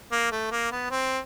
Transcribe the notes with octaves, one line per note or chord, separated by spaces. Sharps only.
A#3
A3
A#3
B3
C4